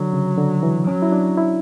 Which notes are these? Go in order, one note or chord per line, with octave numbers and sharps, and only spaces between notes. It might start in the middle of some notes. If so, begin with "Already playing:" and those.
Already playing: D3 F#3
C#3
D3
E3
F#3 C#4
E4
D4
E4